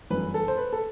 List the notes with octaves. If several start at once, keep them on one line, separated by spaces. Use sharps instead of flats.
G1 F#2 E3 B4
A4
C5
B4
A4